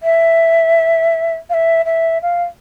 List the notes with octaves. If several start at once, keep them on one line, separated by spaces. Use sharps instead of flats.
E5
F5
E5
E5
F5